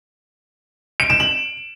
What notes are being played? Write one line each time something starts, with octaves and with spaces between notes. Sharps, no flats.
D7
E7
F#7